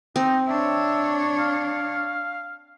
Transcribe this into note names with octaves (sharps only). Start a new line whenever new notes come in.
C4 D#4
D4 C#5 E5
F5